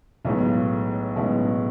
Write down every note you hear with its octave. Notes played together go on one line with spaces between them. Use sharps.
B1 A2 G#3 B3
B1 A2 G#3 B3